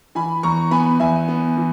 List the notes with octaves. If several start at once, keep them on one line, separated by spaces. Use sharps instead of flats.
E3 G#5 B5
E2 A#5 C#6
B3 G#5 B5
E2 E5 G#5
B3
E3